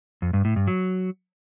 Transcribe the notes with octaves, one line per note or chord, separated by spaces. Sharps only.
F2
G2
A2
G2
F#3